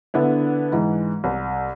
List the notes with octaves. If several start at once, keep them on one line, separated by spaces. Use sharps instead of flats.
D3 B3 D4 E4
G#2 E3
C2